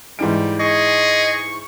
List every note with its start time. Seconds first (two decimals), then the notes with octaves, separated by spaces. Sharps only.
0.19 G#2 E3 G3 D7
0.60 G#4 D#5 C#6